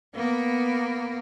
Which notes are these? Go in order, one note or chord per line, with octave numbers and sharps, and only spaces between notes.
A#3 B3